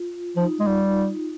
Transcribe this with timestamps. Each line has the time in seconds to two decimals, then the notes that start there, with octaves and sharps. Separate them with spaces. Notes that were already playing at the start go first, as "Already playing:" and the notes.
Already playing: F4
0.36 F3 D#4
0.60 G#3
0.67 G3